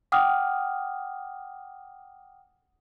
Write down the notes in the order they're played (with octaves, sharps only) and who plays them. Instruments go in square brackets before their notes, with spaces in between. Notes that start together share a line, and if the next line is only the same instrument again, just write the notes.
[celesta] F#5 G5 D6 D#6 F6